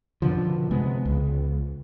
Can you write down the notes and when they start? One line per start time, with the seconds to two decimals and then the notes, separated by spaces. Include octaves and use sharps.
0.22 F#2 B2 D3 F3
0.71 C3 G#3 B3
1.05 C#2